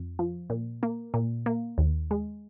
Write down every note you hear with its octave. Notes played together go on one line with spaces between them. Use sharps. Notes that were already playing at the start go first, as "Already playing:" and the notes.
Already playing: F2
F3
A#2
A#3
A#2
A#3
D#2
G#3